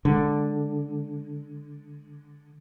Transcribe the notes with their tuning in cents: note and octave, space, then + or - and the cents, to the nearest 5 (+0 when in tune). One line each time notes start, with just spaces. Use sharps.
D3 -5 G#3 +0